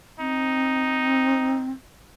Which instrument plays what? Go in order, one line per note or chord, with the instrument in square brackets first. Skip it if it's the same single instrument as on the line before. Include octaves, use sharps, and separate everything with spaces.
[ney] C4 [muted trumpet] D#4